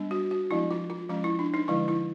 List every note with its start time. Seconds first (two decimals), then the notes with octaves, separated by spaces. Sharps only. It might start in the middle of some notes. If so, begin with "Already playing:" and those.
Already playing: G3 B3 D4
0.11 F#4
0.31 F#4
0.51 F3 G#3 B3 D4 E4
0.71 F4
0.90 F4
1.09 F3 G#3 C#4 F4
1.24 E4
1.39 D4
1.54 D#4
1.68 D3 F3 G#3 E4
1.88 E4